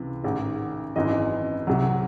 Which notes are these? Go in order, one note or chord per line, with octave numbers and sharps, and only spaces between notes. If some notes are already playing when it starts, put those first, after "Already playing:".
Already playing: C#2 C3 E3
A1 G#2 D#3
G#1 F#2 E3 D#5
C2 C3 F#3